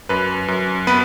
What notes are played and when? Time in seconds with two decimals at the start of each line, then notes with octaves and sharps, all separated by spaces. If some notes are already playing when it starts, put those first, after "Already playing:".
0.09 F#2 B4
0.48 F#2
0.87 B3 B4